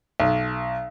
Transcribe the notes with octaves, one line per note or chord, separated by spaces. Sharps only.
B1